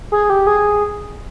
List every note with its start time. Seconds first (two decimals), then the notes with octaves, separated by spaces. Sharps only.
0.12 G#4
0.30 G4
0.47 G#4